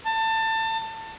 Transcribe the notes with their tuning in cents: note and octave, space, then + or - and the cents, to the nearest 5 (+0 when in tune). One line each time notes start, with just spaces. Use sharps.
A5 +25